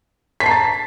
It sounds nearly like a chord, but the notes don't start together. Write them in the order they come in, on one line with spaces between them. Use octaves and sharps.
B6 A5 C7 A#5 A6